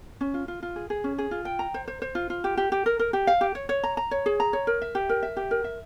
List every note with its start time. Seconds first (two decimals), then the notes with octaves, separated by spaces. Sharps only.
0.21 C#4
0.34 F4
0.48 F4
0.63 F4
0.76 G#4
0.90 G#4
1.04 C#4
1.18 G#4
1.31 F4
1.45 G5
1.59 A#5
1.74 C5
1.88 C5
2.02 C5
2.15 F4
2.30 F4
2.44 G4
2.57 G4
2.72 G4
2.86 A#4
2.99 A#4
3.13 G4
3.27 F5
3.41 G4
3.55 C#5
3.69 C#5
3.84 A#5
3.97 A#5
4.11 C#5
4.26 G#4
4.40 A#5
4.53 C#5
4.67 A#4
4.82 E5
4.95 G4
5.09 A#4
5.23 E5
5.37 G4
5.51 A#4
5.64 E5